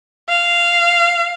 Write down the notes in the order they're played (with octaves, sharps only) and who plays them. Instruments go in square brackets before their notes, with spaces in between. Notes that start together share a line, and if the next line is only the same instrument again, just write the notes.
[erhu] F5